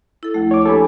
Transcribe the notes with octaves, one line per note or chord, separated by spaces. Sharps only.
E4 A4
D2 F3 A3
C#5 D6
A#3 D4 G4 A4 G#5 B5